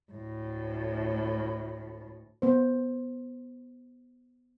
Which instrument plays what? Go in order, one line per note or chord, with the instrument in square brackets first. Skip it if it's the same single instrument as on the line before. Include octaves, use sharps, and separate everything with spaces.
[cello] D2 A2
[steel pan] B3 C5